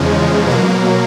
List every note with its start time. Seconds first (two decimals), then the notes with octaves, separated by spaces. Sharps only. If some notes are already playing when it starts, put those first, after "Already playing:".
Already playing: E2 C#3 F3 G#3
0.46 B2 F#3 A#3